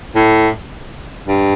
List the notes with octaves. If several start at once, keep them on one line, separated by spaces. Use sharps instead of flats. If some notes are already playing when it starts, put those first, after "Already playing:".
A2
G2